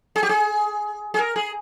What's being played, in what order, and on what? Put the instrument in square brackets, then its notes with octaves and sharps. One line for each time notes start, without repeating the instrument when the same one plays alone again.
[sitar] G#4
G4
G#4
G#4
A#4
G#4